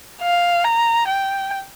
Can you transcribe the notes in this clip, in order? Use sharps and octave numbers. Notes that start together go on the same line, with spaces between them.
F5
A#5
G5